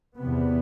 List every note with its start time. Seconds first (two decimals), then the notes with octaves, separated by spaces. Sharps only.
0.19 E2 C3 B3